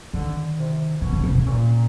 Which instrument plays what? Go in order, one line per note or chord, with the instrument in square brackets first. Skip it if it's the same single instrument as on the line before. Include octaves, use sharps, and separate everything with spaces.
[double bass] D3 [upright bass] D#3
[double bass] C3
[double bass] B2 [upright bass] D#3
[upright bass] C#3
C3
C#3
[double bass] A#2